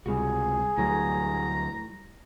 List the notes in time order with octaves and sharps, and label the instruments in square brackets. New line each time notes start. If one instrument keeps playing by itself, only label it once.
[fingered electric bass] C#2 C3 [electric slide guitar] G3 F4 F#4 [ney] G#4
[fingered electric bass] D2 F#3 [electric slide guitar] A2 E3 G3 [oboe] A#5